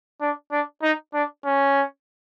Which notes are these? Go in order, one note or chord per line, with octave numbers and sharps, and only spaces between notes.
D4
D4
D#4
D4
C#4